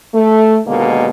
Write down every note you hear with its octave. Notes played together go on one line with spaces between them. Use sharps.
A3
D#2 B2 D3 D#3 G#3 A#3